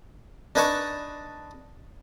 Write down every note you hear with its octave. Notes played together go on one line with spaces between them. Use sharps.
D4 D#4 B4 G#5 A5 C#6